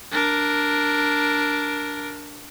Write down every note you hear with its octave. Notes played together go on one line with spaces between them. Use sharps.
D4 A#4